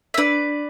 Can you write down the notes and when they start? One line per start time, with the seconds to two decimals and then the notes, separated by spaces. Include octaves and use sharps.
0.14 E5
0.17 D4 B4 D5